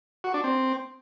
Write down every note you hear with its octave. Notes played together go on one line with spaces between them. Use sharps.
F#4
D4
C4